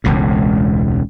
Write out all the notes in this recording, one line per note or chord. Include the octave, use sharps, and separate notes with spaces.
E1 C#2 A2